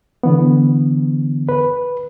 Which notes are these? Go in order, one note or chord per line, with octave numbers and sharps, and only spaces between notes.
D3 E3 B3
B4